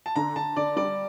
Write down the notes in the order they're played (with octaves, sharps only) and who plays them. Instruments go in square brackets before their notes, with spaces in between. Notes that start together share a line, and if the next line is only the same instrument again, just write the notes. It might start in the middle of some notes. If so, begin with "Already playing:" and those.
[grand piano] A5
[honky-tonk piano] D3 [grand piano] A#5
[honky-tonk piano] D3 [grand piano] A5
[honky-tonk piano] D3 [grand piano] D5
[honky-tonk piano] G3 [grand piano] D5